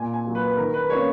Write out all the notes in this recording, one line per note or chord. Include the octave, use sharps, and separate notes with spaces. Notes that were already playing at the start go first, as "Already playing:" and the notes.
Already playing: A#2 G#5
G#5
F#3 A#3
B4
B4
D#3 A#4
B4
A#3 C#4 C#5